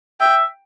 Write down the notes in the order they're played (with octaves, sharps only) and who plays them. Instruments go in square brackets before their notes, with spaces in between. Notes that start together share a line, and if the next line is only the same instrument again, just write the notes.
[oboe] E5 [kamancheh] G5